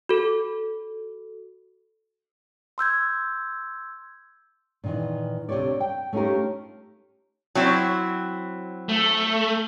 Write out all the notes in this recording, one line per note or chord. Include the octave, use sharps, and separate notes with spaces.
F#4 A4
C6 E6 G6 G#6
A#2 D#3 E3
D2 C3 G#3 G4 C#5 D5
G5
A3 C#4 D#4 F4 G4 A#4
F#3 C4 E4
A3